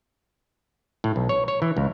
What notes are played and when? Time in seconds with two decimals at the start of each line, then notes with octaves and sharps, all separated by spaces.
1.04 A2
1.16 B1
1.29 C#5
1.48 C#5
1.62 E3
1.77 C#2